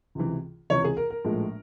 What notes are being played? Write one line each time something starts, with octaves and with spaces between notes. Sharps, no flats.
C#2 C3 E3
C#2 C3 E3 C#5
G#4
A#4
A#4
A#1 A2 F3 G#3